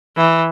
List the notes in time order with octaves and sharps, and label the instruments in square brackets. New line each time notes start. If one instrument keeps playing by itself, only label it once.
[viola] E3